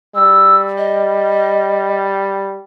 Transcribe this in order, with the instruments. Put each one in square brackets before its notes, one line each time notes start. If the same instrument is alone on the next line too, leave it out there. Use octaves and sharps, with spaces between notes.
[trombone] G3 [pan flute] E6
[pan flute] D#5